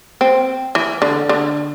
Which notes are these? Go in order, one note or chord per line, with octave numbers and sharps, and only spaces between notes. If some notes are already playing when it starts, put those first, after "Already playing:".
C4
E3
D3
D3